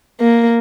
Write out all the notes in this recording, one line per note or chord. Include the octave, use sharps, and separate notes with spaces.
A#3